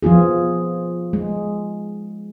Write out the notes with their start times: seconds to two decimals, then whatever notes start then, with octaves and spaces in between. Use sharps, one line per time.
0.03 F3 B3 F4 G#4
1.13 G#3